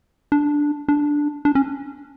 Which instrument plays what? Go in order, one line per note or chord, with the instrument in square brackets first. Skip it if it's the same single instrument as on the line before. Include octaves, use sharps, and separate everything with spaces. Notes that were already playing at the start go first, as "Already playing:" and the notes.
[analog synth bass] D4
D4
D4
C#4